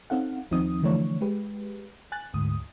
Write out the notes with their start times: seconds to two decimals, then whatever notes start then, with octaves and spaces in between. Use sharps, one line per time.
0.10 C4 C#4 D#4 A4 F5 F#5
0.51 D#2 F3 C4 D#4 D#6
0.82 D3 E3 F3 A3 D4 C#5
1.21 G#3 G4 B4
2.12 G#5 F#6 A6
2.33 D2 G#2 D#6